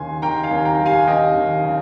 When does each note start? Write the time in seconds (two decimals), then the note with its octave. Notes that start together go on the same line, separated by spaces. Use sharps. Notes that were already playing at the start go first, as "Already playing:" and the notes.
Already playing: D#2 C#3 A#3 G#5 C6
0.22 D#2 G5 A#5
0.43 F5 G#5
0.51 D#2
0.65 G5 A#5
0.79 G3
0.86 F5 G#5
1.08 D#2 D#5 G5
1.35 D#2
1.64 C#3